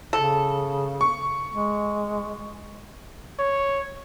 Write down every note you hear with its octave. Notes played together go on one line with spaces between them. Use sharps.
C#3 A4
C#6
G#3
C#5